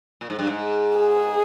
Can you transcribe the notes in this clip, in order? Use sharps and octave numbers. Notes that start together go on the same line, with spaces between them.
A#2
G#2
G2
G#2
G#4